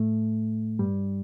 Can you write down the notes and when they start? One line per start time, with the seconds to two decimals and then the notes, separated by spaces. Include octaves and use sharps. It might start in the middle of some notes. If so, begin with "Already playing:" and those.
Already playing: A2 A3
0.79 G2 G3